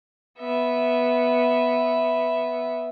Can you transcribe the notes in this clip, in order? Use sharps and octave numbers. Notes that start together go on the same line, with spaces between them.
B3 E5